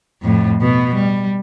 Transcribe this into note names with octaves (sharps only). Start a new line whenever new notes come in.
F2 A2
B2 B3
G3